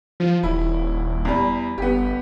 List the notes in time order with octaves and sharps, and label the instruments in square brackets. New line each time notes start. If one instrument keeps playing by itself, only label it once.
[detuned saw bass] F3 [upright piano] F4
[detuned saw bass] D#1 [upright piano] E4
[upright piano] E2 G3
[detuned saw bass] G1 [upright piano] B3 G4